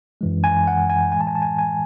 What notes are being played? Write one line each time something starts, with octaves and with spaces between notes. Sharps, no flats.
F#2 E3 G#3
G#5
F#5
G#5
A2 E3 G#3 G#5
A5
G#5
A5
G#5
G#5